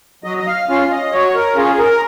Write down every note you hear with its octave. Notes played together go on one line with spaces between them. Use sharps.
F#3 D#5
D#5
F5
C#4 F4 F5
D#5
F#3 C#5
A#4
C#4 F4 G#4
A#4